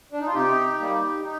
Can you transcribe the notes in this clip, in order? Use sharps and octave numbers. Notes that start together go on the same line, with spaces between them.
D4
D#4
F4
C3 D#4 G4
G3 A#3
D#4